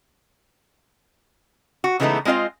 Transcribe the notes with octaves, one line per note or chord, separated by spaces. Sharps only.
F#4
C#3 E3 G#3 A3 B3 D#4
G#3 C4 F4 D#5 F5